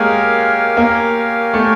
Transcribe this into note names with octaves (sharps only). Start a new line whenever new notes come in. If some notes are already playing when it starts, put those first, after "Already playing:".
Already playing: G#3 A#3 G4 A#4 C#5 F5 G#5
A#3
A3